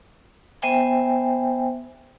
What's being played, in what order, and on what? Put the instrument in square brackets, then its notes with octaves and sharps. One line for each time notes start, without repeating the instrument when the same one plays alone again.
[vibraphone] B3 C5 E5 G5 G#5